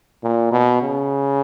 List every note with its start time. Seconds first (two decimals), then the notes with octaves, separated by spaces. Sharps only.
0.23 A#2
0.52 B2
0.82 C#3